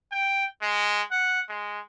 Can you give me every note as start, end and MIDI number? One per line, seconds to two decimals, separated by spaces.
0.12 0.45 79
0.62 1.02 56
1.11 1.41 78
1.49 1.80 56